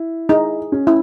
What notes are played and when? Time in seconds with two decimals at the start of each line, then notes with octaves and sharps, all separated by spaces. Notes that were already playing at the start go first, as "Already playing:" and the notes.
Already playing: E4
0.29 D#4 G#4
0.72 C#4
0.87 E4